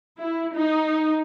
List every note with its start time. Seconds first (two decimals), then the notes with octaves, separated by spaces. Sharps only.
0.17 E4
0.54 D#4